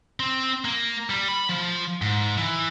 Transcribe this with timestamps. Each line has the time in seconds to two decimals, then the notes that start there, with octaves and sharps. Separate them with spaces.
0.20 C4
0.65 A#3
1.10 G3
1.28 B5
1.49 F3
2.02 G#2
2.38 E3